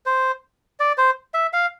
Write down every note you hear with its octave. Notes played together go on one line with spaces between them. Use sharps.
C5
D5
C5
E5
F5